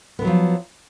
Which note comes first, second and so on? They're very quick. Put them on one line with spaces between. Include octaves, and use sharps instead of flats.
B3 D3 F#3 F3